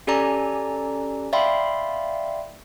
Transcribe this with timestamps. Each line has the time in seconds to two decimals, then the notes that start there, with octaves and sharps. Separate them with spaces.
0.07 C#4 G4 A4 D5 G#5 A#5
1.33 D5 E5 F5 G5 B5 C6